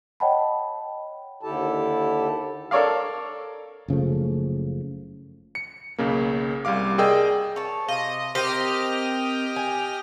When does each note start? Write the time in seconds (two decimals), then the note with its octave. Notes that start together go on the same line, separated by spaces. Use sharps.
0.20 C#5 D#5 F#5 G5 A5 B5
1.43 D#2 D3 E4 G4 A4 A5
2.71 A4 A#4 C#5 D5 F5
3.88 F#1 C#3 F3 A3
5.55 C#7
5.98 B1 C#3 A#3
6.65 C2 G3 F5 D6
6.98 G#4 A#4 D5 D#5 G5 E6
7.56 C#5 A5
7.88 C3 F4 D#5
8.35 C4 G4 A#4 D#5 G5 F6
9.56 G#5